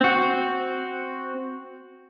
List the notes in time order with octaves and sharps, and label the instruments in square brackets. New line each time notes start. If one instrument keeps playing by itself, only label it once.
[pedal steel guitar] C4 F#4